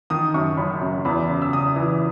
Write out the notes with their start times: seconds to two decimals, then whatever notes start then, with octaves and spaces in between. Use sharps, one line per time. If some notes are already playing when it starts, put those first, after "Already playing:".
0.10 D#3 D#6
0.34 F#2 C#6
0.57 F#1 B5
0.82 F#2
1.05 E2 B5
1.29 C#3
1.42 E6
1.53 C#3 D#6
1.76 E3